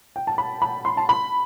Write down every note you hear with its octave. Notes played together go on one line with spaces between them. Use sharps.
G5
A5
B5
B5
C6
A5
B5